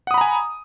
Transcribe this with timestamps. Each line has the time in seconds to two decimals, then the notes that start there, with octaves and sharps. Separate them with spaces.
0.07 F#5
0.11 D#6
0.14 B5
0.18 A#5
0.21 G#5